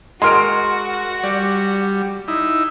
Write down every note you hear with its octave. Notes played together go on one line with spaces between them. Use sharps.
G#3 F#4 A#4 C6 F6 D7
G3 D5
D#4 E4